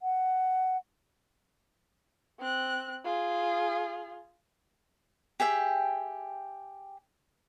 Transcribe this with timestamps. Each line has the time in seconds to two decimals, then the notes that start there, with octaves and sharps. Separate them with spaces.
0.01 F#5
2.40 C4 F#6
3.05 F4 G#4
5.40 G4 G#4 E5 G5